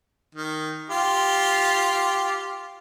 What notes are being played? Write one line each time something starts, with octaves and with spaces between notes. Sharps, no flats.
D#3
F4 G4